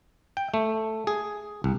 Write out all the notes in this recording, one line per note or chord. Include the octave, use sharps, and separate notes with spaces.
G5
A3
G#4
C2